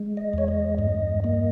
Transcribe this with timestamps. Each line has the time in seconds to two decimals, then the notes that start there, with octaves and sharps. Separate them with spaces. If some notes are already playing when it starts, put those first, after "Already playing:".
Already playing: G#3
0.17 D#5
0.33 E2 C#5
0.48 D#5
0.78 G2 D#5
1.24 A#3 D#5